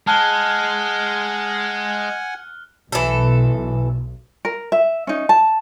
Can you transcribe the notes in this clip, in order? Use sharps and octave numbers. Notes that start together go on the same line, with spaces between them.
G#3 F#5 G#5 A5 F6 F#6 G7
B1 E3 A4
A#4
E5
C#4 D#4
A5